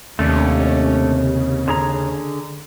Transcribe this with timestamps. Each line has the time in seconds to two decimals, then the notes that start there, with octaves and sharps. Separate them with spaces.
0.19 D#2 C3 A3 C#4 D4
1.03 C#3
1.68 D3 G#4 A#5